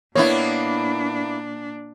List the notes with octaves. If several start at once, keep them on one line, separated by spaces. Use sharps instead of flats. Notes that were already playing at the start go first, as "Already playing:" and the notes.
A#2 A#3 B3 D4 E4 C#5